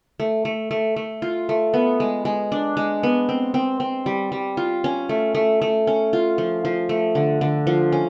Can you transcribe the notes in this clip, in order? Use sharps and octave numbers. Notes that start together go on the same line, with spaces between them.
A3
A3
A3
A3
F4
A3
B3
G#3
G#3
D4
G#3
B3
C4
C4
C4
G3
G3
F4
C#4
A3
A3
A3
C#4
F4
F3
F3
A3
D3
D3
F3
C#4